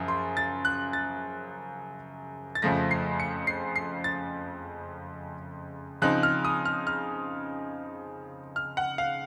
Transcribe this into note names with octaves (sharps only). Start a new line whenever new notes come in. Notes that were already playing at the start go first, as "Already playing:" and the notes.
Already playing: F#2 C#3 F3
C6
A6
F#6
A6
A6
F2 C#3 F3 A3 A#6
C7
C#7
C7
C7
A6
C#3 F3 C4 D#4 F#6
F6
D#6
F6
F6
F6
F#5
F5